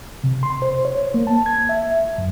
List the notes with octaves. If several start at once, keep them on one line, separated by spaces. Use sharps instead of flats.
C3
C6
C5
C#5
A#3
A5
G#6
E5
F#2